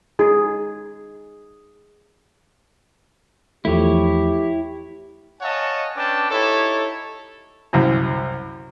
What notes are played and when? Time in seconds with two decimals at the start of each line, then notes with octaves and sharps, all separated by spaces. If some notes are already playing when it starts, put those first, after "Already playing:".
0.19 D#4 G#4
3.65 E2 F3 A3 E4 G4 C#5
5.41 C#5 D#5 F5 F#5 G#5 A5
5.96 C#4 D4 B4 D5 G5 A5
6.30 D#4 E4 G4 A4 C#5
7.73 C2 F#2